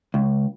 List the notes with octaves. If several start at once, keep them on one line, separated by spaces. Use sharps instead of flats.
C#2